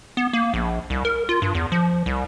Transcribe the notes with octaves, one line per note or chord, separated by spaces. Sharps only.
B3
A#3
A#1
C2
A#4
F4
G2
E2
F3
C2